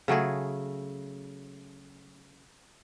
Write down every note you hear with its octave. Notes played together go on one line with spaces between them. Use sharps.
C#3 F#3 A3 G#4